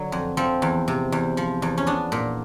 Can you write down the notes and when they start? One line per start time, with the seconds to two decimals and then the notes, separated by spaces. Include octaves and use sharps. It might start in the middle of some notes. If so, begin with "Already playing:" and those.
Already playing: D3 F#3
0.12 F2
0.37 F3 C4
0.62 E2
0.88 C3
1.12 E2
1.37 F3
1.62 E2
1.78 C#4
1.87 B3 D4
2.12 A#2